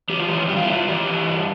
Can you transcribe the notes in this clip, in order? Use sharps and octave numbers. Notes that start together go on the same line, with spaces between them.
E3 G4
F4
E3 G4
G2 G4
F4
G2 E4
F4
E3 G4
E3
G2